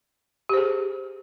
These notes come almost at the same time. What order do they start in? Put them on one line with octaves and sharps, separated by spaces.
G4 C5 G#4